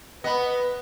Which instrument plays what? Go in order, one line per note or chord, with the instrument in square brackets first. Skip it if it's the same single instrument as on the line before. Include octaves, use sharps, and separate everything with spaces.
[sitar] B3 [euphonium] B4 [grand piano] D#5 F#5 B5